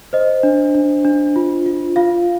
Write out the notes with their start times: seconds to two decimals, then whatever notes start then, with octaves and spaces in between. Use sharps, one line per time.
0.13 C5 D#5
0.43 D4
0.75 D4
1.05 D4
1.36 F4
1.66 F4
1.96 F4 F5